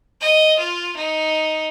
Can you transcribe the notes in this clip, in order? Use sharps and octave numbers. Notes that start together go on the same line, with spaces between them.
D#5
F4
D#4